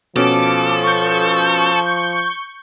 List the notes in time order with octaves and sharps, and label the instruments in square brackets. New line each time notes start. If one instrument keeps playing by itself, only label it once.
[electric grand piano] B2 C#4 [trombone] F3 [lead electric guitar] A4 [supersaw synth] D6
[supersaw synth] C#6 G6